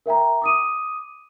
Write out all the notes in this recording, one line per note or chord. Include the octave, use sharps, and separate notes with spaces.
A#4 E5 G5 A#5
D6 D#6 D#7